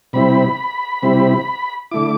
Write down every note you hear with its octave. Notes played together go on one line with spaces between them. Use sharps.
C3 G3 C4 E4 B5
C3 G3 C4 E4
D3 A3 E4 D6